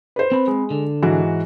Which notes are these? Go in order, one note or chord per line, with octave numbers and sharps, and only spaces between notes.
B4 C5
C4 B5
G#3
D3
G#2 E3 F#4